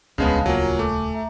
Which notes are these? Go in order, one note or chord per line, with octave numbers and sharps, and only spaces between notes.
D#1 C#2 C#3 G#3 B3 D4 F5 A5
F#3 A#3 F4 F#5 G#5
A3 G#5 D6
E5 A#5